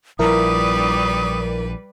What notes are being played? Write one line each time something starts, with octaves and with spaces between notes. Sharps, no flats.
A#1 F3 G3 E4 A#4 B4 D5 D#6